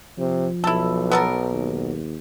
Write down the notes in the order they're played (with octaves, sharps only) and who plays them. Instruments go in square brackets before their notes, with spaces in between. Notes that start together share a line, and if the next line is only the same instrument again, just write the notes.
[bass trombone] C3 [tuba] F3
[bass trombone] B1 [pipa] E4 A4
[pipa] B3 A4 A#4
[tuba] D#2